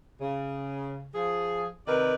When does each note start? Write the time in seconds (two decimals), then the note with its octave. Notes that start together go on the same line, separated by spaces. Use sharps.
0.21 C#3
1.13 F3 G#4
1.86 C3 D#3 A#4 B4 D5